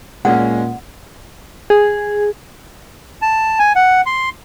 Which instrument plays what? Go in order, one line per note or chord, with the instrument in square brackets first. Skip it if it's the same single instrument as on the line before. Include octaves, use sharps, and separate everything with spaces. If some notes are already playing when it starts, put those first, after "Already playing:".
[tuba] A#2 [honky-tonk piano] G#3 C#4 [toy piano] D5 F#5
[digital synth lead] G#4
[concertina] A5
G#5
F#5
C6